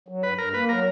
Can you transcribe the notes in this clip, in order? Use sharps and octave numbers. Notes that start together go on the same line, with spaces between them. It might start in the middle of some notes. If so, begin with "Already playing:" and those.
F#3
G2 B4
G2 A#4
A#3 B4
F#3 A#4